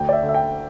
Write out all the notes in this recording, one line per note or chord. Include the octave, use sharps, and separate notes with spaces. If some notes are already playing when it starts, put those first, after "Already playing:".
Already playing: D2 G5
D5
E5
D3
E5
G5